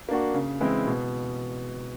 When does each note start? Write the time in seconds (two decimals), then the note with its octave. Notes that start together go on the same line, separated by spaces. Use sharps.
0.09 A#3 D4 F#4
0.34 C#3
0.60 E3 G#3 C4 E4
0.87 B2